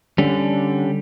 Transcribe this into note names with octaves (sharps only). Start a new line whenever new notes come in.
D3 G3 C#4